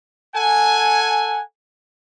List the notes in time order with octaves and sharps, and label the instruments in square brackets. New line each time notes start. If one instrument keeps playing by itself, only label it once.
[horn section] A4 F#5 G#5